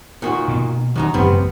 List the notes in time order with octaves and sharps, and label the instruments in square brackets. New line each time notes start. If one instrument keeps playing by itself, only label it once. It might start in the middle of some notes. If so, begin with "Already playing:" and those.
[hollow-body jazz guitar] A#2 D#3 F#4
[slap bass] B2 A#3
[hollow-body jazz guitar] F#2 D#4 A#5 [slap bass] D#3
[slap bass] A1 F#2 C#3 [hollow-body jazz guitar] G3 B3 C4